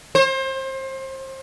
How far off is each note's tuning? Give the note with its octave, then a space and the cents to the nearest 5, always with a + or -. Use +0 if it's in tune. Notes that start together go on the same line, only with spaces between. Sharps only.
C5 +30